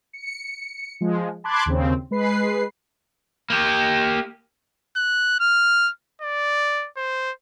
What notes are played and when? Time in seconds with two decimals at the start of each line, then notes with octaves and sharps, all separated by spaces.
0.13 C#7
1.01 F3 G#3
1.44 A5 B5 C6 D6 F#6 G#6
1.66 D#2 C#3 C4
2.11 G#3 B4 C7
3.50 A#3 G4
4.96 F#6
5.40 F6
6.21 D5
6.97 C5